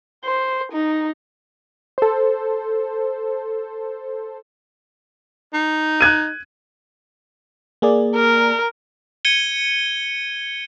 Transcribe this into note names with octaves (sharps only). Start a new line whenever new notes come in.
C5
D#4
A4 C5
D#4
F#6 G#6 D#7
A#3 G#4 D5
A#4
G#6 C#7 D#7 G7